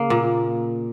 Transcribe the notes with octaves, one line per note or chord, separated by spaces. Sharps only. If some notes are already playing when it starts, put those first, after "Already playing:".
Already playing: C#3 A#3
A#2